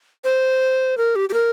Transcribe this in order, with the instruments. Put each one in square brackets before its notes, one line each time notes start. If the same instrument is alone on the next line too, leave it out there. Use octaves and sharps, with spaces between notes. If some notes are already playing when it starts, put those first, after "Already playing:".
[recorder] C5
A#4
G4
G4
A#4